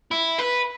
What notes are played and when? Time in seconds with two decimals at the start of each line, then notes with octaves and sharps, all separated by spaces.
0.11 E4
0.38 B4